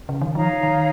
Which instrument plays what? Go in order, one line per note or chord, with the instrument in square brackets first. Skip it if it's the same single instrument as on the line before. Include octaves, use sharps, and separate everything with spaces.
[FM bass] C#3
D#3
[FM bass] F3 [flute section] D#4 C#5 F5 A#5
[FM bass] D#3